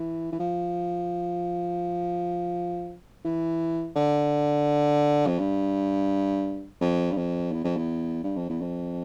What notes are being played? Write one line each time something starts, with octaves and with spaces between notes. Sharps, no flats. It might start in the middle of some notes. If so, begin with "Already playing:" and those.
Already playing: E3
E3
F3
E3
D3
F2
G2
F2
G2
F2
E2
F2
E2
G2
F2
E2
F2